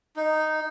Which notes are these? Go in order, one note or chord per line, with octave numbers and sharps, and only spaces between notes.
D#4